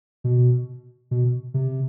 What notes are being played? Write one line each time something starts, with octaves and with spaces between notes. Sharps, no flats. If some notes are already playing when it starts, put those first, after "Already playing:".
B2
B2
C3